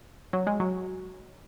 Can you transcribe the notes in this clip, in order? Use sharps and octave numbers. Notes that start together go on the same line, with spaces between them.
F#3
G#3
F#3